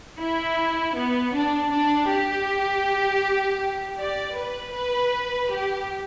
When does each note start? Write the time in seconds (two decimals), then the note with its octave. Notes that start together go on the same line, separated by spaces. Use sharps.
0.19 E4
0.96 B3
1.34 D4
1.72 D4
2.09 G4
4.00 D5
4.38 B4
4.75 B4
5.51 G4